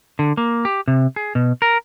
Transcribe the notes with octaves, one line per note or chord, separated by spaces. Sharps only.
D3
A#3
G4
C3
G#4
B2
A#4